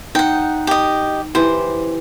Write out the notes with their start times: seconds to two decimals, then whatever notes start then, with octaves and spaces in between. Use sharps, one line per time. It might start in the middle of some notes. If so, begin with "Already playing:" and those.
0.15 D#4 F#5 G5
0.67 G4 D#5
1.35 E3 G4 C5